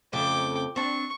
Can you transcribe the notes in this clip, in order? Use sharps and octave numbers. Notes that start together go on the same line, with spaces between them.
F2 C#3 A3 G5 D6
C4 D4 C#6